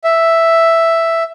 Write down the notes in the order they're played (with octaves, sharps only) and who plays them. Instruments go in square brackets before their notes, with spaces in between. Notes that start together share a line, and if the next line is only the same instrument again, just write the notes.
[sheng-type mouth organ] E5